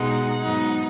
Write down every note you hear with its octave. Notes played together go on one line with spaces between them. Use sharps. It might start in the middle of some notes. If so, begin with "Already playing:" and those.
Already playing: B2 G#3 D#4 F#5
G#2 F#3 B3 D#4